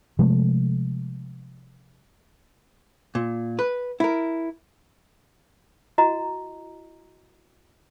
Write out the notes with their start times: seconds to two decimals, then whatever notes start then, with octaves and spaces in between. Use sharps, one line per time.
0.19 C3 F3 G#3 A3
3.15 A#2
3.59 B4
4.00 E4 A#4
5.98 E4 F#4 D#5 A#5